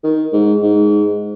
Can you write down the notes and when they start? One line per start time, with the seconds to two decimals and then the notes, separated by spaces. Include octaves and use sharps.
0.04 D#3
0.33 G#2
0.63 G#2